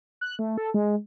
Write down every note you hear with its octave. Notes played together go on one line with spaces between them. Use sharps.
F#6
A3
A4
G#3